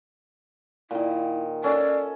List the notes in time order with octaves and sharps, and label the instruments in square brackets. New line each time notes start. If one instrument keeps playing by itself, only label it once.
[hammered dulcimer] A#2 D#3 [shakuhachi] E4
[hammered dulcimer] C#4 A4 [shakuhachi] D5